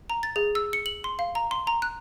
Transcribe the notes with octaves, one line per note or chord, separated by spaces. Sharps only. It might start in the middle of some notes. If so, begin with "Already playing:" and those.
A#5
A6
G#4
E6
C#7
F#7
C6
F5
A#5
C6
A#5
F#6